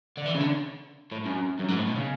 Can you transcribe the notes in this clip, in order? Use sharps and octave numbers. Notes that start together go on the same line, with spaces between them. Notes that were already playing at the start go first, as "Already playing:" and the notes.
D3
E3
C#3
D3
A2
F#2
F#2
G#2
A2
B2
C#3